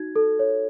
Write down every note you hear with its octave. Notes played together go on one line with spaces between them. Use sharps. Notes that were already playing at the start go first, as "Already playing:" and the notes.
Already playing: D#4 F#4 G#6
A4
C#5